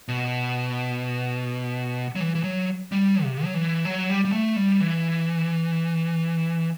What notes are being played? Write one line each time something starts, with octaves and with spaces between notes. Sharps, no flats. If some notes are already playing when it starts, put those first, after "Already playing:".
B2
F#3
E3
E3
F#3
G3
C3
F#3
E3
F#3
G3
G3
A3
G3
E3